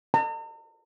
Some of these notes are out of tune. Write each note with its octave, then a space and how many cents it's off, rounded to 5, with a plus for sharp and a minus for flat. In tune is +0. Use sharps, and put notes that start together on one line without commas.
A#5 -45